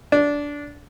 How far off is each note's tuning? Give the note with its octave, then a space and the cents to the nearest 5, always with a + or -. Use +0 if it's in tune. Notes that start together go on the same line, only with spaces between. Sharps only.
D4 -15